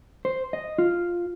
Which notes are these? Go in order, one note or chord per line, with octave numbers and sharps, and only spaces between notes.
C5
D#5
F4